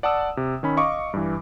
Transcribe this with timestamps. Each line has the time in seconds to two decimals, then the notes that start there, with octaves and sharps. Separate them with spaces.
0.03 D5 F#5 A5 D#6 E6
0.37 C3
0.63 D#3 C#4 B5
0.77 D#5 F5 C#6 D6
1.14 G2 E3